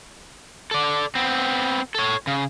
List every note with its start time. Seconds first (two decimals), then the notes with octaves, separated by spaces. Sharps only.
0.71 A4 D5
1.15 B3 C4
1.95 A4 C#5
2.27 C#3